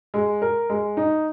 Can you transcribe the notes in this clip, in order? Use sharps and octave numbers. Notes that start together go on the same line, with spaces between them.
G#3
A#4
G#3
D#4